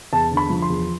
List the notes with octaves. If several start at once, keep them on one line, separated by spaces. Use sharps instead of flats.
E2 A5
D3
B5
F3
C6
E2